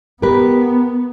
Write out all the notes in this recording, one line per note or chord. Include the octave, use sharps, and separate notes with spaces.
B3 G4 A#4 B4